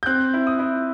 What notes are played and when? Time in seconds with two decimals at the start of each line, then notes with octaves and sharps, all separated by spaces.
0.03 G6
0.06 C4 F#6
0.34 E4
0.47 D#6
0.59 E4